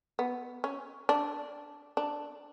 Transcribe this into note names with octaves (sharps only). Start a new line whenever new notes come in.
B3
C#4
D4
D4